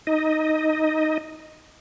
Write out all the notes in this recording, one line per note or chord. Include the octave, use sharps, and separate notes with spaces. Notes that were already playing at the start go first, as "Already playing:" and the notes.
D#4 D#5